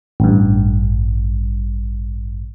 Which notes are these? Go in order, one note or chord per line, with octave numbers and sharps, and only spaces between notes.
A1 G2